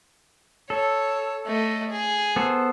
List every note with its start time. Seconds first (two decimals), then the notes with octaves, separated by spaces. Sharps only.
0.70 A4 C#5
1.46 A3 D#5
1.90 G#4
2.36 B3 A4 C5